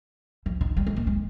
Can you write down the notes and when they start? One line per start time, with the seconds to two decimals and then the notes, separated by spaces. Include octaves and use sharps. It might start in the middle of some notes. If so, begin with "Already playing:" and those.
0.46 F3
0.61 D#3
0.77 G3
0.87 G#3
0.96 A#3
1.07 G#3